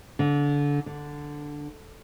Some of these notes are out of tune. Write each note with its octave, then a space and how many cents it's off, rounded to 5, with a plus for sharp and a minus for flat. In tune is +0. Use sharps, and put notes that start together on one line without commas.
D3 -25
D3 +0